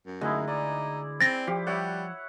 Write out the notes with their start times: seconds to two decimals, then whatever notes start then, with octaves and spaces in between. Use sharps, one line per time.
0.06 F#2
0.21 D2 G#3 D#4 E4
0.48 D#4 D5
1.21 C4 A6 A#6
1.47 F3 G4
1.67 G3 C#5 E5 F#5